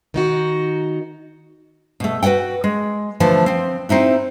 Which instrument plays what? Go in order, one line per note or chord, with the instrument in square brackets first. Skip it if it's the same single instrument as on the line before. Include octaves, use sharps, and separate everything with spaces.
[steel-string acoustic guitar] D#3 D#4 F#4
[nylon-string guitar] B2 A3
F#4 B4 D5 F#5 G5
G#3
D3 E3 F3 A3
F3 C4
C4 D#4 E4 F#4